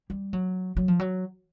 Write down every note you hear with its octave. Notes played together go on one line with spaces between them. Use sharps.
G3
F#3
F#3
F3
F#3